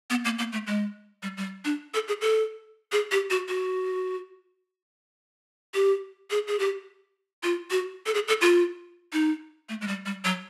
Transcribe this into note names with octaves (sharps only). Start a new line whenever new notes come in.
B3
A#3
A#3
A3
G#3
G3
G3
D4
A4
G#4
A4
G#4
G4
F#4
F#4
G4
G#4
G#4
G4
F4
F#4
A4
G#4
A4
F4
D#4
A3
G#3
G3
G3
F#3